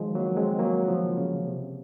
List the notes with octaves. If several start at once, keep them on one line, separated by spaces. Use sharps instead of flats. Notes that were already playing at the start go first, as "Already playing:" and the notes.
Already playing: D#3 F3 F#3 G#3
F#3 A#3
G#3 C4
F#3 A#3
C#3 F3
C#3
C3